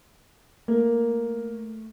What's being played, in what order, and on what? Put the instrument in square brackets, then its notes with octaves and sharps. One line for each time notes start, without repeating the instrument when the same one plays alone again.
[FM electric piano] A3 [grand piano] A#3